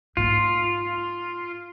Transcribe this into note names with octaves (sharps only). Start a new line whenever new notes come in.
G#2 A#3 F4